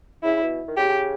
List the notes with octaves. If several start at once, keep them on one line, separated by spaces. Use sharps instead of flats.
C#3 E4
B2
D#3
C#3 G4